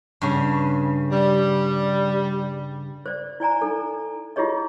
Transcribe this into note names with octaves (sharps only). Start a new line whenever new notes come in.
G2 C#3
G3
C5 D5
E4 D5 G#5 A#5
D#4 A4
E4 F4 G4 G#4 C#5 D#5